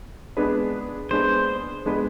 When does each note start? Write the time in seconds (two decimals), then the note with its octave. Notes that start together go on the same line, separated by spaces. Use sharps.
0.37 G#3 B3 D4 G#4 B4
1.11 G#3 B3 D4 G#4 B4 C5
1.86 G#3 B3 D4 G#4 B4